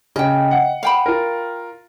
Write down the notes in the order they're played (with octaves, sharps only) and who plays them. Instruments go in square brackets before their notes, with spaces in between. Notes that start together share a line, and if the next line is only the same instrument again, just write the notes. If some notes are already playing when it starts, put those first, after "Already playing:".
[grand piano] C#3 [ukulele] D#5 G5
[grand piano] F#5
[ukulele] F5 G5 B5
[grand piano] F4 A#4